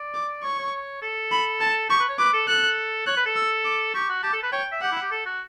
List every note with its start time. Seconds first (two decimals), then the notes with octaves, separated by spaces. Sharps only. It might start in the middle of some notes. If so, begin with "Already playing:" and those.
Already playing: D5
0.15 D6
0.44 C#5 C#6
0.59 C#5
1.02 A4
1.31 B5
1.61 A5
1.90 G4 C#6
2.00 B4
2.09 C#5
2.19 B4 D6
2.33 A4
2.48 A4 F#6
3.07 C#5 F#6
3.17 B4
3.26 A4
3.36 E6
3.65 D6
3.94 G4 C#6
4.09 F#4
4.23 G4 A5
4.33 A4
4.43 B4
4.52 C#5 G5
4.72 E5
4.82 G4 F#5
4.91 E4
5.02 G4
5.11 A4
5.26 F#4